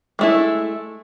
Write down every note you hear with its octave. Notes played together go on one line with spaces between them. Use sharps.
G#3 A3 E4